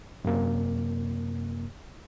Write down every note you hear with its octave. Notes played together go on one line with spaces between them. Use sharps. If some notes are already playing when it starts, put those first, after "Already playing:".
F#2 C3 A#3